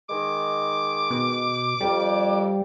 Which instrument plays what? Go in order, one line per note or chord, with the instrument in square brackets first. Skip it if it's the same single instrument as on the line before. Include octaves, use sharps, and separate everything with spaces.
[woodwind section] D#3 G#3 [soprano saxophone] D6
[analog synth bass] B2
[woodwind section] F2 [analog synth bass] G3